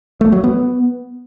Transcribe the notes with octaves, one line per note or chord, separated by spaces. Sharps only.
A3
F#3
B3